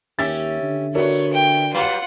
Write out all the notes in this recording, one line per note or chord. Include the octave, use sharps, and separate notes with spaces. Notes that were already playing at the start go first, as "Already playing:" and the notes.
D#2 C#4 G4 E5 A6
D3
A3 B3 F#4 A#4 C#5 D5
G5
F#3 G3 F4 B4 F#5